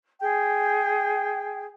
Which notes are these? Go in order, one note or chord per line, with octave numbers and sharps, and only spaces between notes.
G#4 G5